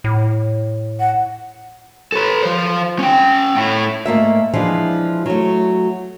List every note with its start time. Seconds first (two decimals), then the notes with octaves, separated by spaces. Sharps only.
0.04 A2
1.00 F#5
2.12 A4 B4
2.43 F3 C5
2.99 C#4 G5
3.57 A2 E4
4.05 G#2 A3 A#3 E5
4.53 E3 F3 G#3 D4 E4
5.26 F#3 A3